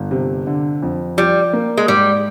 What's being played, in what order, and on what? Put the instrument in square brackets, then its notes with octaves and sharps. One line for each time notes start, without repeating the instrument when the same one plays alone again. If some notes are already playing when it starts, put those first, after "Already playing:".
Already playing: [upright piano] G1
C3
D3
F2
[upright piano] F3 [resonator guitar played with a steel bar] G3
[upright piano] A#3
[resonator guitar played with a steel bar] G#3
[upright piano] G#2 [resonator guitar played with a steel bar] G3